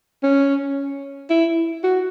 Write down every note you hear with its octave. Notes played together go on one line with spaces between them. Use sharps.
C#4
E4
F#4